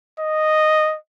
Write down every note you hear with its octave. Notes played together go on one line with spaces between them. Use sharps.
D#5